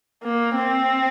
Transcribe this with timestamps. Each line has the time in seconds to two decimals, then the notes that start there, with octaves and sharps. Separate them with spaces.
0.24 A#3
0.56 C4